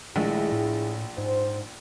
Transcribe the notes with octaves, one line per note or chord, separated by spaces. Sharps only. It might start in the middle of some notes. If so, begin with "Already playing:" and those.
A#1 D#3 G#3 A3 E4 G#4
A2
G#2 C5